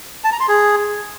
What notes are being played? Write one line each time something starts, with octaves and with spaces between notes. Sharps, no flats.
A5
A#5
C6
G#4